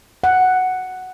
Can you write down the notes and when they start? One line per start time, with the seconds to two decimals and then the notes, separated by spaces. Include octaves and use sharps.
0.24 F#5